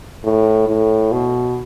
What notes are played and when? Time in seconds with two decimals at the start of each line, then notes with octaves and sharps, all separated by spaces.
0.24 A2
0.68 A2
1.12 B2